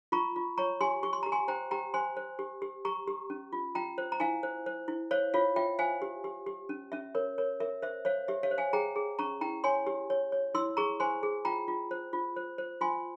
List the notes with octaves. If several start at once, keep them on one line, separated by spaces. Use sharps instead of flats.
F4 A#5 C#6
F4
C#5 A#5 C#6
G4 G#5 C6
G4 C#6
C6
G4 A#5
G#5 C6
C5 G5 A#5
G4 G5 A#5
C5 G#5 C6
C5
G4
G4
G4 A#5 C#6
G4
C#4
F4
F4 G5 A#5
C5
A#5
E4 F5 G#5
C5
C5
E4
C5 C#5 F5
F4 C#5 F5
F4 E5 G5
C5 F5 G#5
G4
G4
G4
C#4
C#4 E5
A#4 C#5
A#4 C#5
A#4 E5
C5 E5
C5 C#5 F5
G4 E5
C#5 F5
C5
F5 G#5
G#4 G5 A#5
G#4
C#4 A#5 C#6
E4 G5 A#5
C#5 G#5 C6
G4
C#5
C#5
E4 C6 E6
G#4 A#5 C#6
C5 G#5 C6
G#4
F4 G5 A#5
F4
C5
F4
C5
C5
F4 G#5 C6